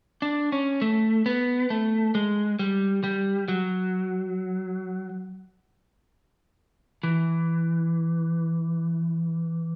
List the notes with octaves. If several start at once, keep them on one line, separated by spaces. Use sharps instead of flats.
D4
C#4
A3
B3
A3
G#3
G3
G3
F#3
E3